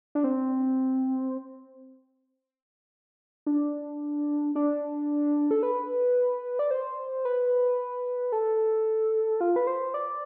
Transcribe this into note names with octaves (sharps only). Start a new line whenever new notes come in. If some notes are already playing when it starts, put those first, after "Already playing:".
D4
C4
D4
D4
A4
B4
D5
C5
B4
A4
F4
B4
C5
D5